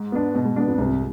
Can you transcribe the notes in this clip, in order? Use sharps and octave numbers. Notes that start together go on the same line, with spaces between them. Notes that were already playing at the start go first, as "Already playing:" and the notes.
Already playing: G#2
B3 D4
G#2 B2
G#2
G#2 B3 D4
F2
C2 G#2
F2